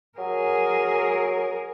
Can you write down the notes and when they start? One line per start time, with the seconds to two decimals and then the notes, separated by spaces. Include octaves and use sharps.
0.18 F#3 G#4 A#4